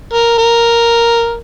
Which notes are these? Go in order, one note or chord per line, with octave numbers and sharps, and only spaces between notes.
A#4
A#4